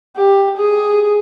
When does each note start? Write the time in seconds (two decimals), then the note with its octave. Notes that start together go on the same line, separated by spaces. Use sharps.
0.17 G4
0.57 G#4